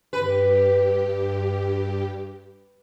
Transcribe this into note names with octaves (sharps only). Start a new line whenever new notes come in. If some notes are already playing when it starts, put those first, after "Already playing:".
G2 G4 B4